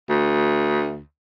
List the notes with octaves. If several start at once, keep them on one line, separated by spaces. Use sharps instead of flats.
D2